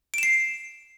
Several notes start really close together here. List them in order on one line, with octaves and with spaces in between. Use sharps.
D7 E7 C7